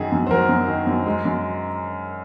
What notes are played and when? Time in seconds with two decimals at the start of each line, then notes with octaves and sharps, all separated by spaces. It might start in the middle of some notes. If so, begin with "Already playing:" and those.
Already playing: F#2 D#3 F#3 G#4
0.12 F#2
0.27 C5
0.31 F#3 A#4
0.49 F#2
0.68 D#3
0.87 F#2
1.06 G#3
1.25 F#2